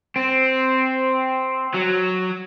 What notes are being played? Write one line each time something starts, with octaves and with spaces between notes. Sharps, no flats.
C4
F#3